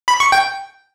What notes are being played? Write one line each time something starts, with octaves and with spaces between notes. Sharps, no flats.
B5
C#6
G5